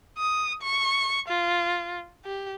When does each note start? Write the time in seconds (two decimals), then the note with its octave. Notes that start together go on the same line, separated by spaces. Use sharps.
0.18 D#6
0.62 C#6
1.28 F4
2.25 G4